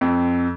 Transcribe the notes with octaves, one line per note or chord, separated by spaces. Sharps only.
F2